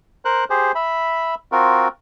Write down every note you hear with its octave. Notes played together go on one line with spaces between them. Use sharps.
A#4 C5 F#6
G4 G#4 C5
E5 B5
C4 F4 F#4 A#4